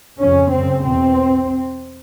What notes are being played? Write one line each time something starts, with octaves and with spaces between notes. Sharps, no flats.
F2 C#3 C#4
F#2 C#3 C4
E2 B2 C4